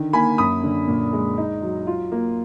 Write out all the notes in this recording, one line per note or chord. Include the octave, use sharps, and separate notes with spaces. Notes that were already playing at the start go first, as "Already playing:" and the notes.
Already playing: D3 D#3
A#3 G#5 B5
F#2 B5 D#6
D3
A#2
G#3
D#4
F#3
F4
A#3